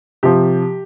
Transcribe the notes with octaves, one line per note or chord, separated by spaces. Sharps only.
C3 F3 G4